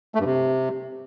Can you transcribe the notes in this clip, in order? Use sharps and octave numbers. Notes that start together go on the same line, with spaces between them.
A3
G2
C3